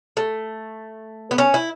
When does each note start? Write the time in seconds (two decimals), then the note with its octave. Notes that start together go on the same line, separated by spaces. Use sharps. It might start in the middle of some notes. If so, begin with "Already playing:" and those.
0.17 A3
1.31 B3
1.38 C#4
1.54 E4